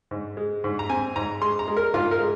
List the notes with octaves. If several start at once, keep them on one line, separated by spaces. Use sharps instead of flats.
G#2
G#3
G#2
A#5
C4 G#5
G#2 A#5
G#3 C6
A#5
G#3
A#4
G#2 F4
A#4
G#3